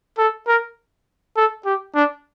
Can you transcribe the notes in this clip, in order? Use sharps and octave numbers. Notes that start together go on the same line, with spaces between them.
A4
A#4
A4
G4
D4